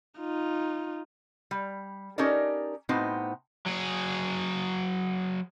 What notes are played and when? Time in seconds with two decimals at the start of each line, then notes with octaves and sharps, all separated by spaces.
0.20 D#4 F4
1.51 G3
2.18 C#4 D#4 G4 A4 A#4 D5
2.89 A2 B3 C4 D#4 F#4 C5
3.66 F#3 G#4